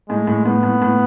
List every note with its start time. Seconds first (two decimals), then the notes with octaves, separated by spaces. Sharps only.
0.09 A2 G#3
0.27 A2
0.46 A2 B3
0.63 A2
0.82 A2